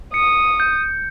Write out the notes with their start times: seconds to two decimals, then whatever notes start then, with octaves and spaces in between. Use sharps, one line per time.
0.14 D#6 C#7
0.60 G6